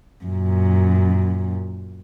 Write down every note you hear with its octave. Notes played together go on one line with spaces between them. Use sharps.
F#2 A#2